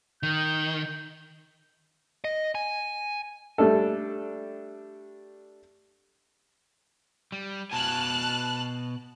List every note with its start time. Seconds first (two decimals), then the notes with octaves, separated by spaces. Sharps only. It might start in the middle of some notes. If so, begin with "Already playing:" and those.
0.23 D#3 G6
2.24 D#5
2.55 G#5
3.58 G3 A3 D4 A4
7.32 G3
7.71 B2 G#5 A5 F6 F#6